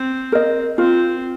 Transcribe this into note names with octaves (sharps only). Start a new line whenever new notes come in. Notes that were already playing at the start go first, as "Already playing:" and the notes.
Already playing: C4
A#4 D#5
C4 F4